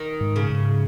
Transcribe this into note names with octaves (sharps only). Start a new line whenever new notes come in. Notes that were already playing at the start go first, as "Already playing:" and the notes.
Already playing: D#3
G#2
C#3
G#2